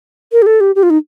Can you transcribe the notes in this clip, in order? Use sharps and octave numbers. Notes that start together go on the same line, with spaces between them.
A#4
G4
A4
G4
G4
F4
D#4